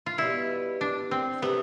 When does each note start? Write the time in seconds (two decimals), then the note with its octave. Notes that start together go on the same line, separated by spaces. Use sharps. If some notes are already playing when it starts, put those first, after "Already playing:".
0.06 F4
0.18 B2 G3 B3 E4
0.81 D4
1.11 C4
1.42 C3 E3 A3 B3